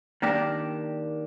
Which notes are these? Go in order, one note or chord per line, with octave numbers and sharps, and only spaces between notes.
D#3 A#3 D4 G4